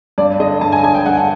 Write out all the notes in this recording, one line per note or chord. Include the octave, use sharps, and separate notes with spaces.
G2 D5
D3 D#5
G2 A5
G#5
D3 G#5
G5
G2 F#5
F#5